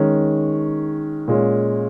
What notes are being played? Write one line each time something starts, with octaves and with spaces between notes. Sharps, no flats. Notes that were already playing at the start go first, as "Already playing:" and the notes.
Already playing: D#3 G#3 C#4
A#2 G#3 C#4